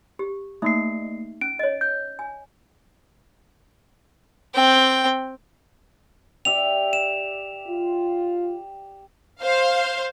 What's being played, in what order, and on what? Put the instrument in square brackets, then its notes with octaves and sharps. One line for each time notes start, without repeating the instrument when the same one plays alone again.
[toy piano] G4
[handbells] A3 A#3 C7 [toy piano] D#4 E5
[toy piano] C#4 [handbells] D7
[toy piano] C#5 D#5
[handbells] G6
[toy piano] G#5
[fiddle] C4 G5
[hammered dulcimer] G4 D5 E5 [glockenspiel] F7
[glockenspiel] E7
[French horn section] F4
[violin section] C5 F5